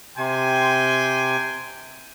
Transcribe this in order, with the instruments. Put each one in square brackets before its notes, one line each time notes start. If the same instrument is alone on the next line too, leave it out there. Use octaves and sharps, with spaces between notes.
[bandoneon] C3 [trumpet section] G5 G#5 C6